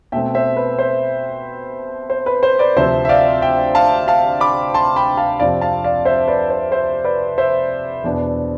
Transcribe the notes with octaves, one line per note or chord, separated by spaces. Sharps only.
B2 A3 C4 E5 G5
C5 E5
B4
C5
C5
B4
C5
B4 D5
D2 C3 F3 C4 C5 E5
E5
D5 F5
E5 G5
F5 A5
F5 A5
B5 D6
A5 C6
G5 B5
F5 A5
F2 C3 F3 C4 D5 F5
F5 A5
D5 F5
C5 E5
B4 D5
C5
C5 E5
B4 D5
C5 E5
E2 B2 B3 D4